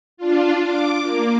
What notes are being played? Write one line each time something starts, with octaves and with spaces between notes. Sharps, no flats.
D4 F4
D6
A#3